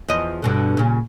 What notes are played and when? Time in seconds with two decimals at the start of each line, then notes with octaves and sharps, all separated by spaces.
0.08 E2 F3 D#5
0.42 G2 B2 D3
0.77 A#2 C#3